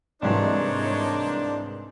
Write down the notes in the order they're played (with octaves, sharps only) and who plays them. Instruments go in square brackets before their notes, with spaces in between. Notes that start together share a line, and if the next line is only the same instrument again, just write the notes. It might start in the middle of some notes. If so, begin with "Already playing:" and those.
[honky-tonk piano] C2 G#2 E3 [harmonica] A#3 D#4 C5 [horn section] D4 [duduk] C#5